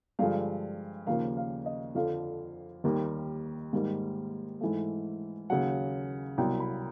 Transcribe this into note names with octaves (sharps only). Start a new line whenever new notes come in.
G2 D3 F3 G#3 F5
D#2 C#3 F3 A#3 F5
F5
D#5
F2 D3 F3 F5
D#2 D#3 G3 A#3
G#2 D#3 G3 A#3
G#2 E3 A3
D#2 C#3 F#3 F#5
C2 B2 F#3 G5
B5